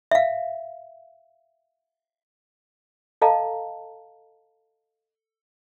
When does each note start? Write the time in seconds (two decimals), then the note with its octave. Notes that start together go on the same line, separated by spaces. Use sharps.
0.11 E5 F5
3.22 A4 D#5 F5 A5 A#5